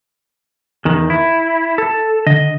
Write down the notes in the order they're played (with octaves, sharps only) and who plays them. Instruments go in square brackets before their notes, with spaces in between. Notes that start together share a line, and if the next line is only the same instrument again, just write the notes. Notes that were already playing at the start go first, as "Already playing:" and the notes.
[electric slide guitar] E2 D#3
E4
A4
[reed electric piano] D3 [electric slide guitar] D#5